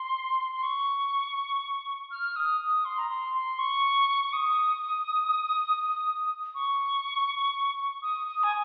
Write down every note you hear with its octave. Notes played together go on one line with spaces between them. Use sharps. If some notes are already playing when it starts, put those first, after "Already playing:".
Already playing: C6
C6
C#6
F6
D#6
D#6
C6
A#5
C6
C6
C#6
C#6
D#6
C#6
D#6
D#6
G#5